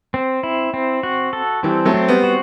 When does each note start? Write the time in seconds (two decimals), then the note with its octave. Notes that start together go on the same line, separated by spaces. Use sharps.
0.14 C4
0.43 E4
0.74 C4
1.03 F#4
1.33 A4
1.63 E3 G3 C4
1.85 F#3 A3
1.94 C4
2.08 G3 B3
2.23 F#4